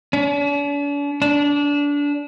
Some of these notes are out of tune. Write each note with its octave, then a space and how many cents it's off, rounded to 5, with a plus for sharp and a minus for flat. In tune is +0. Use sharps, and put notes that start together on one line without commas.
D4 -45
D4 -25